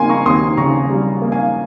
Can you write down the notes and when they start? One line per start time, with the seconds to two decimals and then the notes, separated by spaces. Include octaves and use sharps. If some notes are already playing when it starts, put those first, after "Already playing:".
Already playing: C#3 G3 A#3 G5 G#5 C6
0.09 A#5 C#6
0.26 D#2 C6 D#6
0.57 C#3 A#5 C#6
0.89 G3
1.22 A#3
1.32 F5 G#5